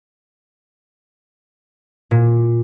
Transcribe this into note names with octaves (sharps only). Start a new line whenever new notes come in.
A#2